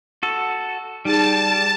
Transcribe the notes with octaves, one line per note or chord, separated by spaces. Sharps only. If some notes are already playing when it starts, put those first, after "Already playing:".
F#4 A4
G3 D#4 G#4 A5